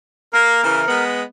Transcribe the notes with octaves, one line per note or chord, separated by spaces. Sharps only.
A#3 A#4
C#3 E3
G#3 B3